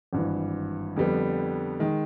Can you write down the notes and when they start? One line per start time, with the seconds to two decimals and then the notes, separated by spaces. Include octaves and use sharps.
0.13 G#1 G2 E3
0.96 F2 D3 G3 B3
1.79 D#3 G#3